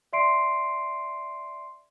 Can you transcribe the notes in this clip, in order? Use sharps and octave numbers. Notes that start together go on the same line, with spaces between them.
D5 E5 C6 C7 D7